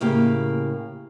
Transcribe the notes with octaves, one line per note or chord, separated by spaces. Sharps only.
A2 C#3 A#3 G4